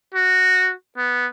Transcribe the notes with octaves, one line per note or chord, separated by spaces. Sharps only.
F#4
B3